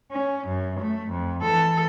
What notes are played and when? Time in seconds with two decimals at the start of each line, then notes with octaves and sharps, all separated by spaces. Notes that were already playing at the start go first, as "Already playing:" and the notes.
0.11 C#4
0.47 F#2
0.80 A3
1.10 F2
1.42 E3 A4